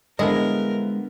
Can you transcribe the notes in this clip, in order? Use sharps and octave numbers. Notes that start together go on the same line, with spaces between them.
D3 F3 G#3 B3 E4 A#4 D#5